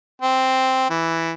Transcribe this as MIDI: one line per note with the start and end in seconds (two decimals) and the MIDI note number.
0.22 0.87 60
0.90 1.33 52